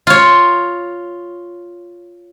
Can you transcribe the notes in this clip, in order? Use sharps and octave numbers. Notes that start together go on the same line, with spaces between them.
F4 C#5